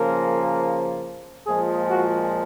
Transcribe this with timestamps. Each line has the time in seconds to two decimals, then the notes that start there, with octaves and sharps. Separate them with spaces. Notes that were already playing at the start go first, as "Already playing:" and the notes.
Already playing: C#3 F3 A#3 A#4
1.46 A#2 F3 G#3 G#4
1.89 F#4